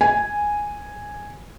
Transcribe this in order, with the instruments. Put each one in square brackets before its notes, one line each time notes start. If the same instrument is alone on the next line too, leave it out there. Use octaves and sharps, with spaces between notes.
[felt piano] G#5